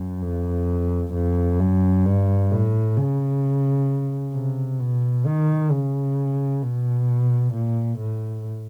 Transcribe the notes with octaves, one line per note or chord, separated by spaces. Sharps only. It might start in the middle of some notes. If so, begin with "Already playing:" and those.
Already playing: F#2
F2
F2
F#2
G2
A2
C#3
C3
B2
D#3
C#3
B2
A#2
A2